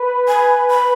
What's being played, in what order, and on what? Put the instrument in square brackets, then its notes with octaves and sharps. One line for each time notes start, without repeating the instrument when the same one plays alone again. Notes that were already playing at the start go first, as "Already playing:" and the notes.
Already playing: [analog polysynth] B4
[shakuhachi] G#5
B5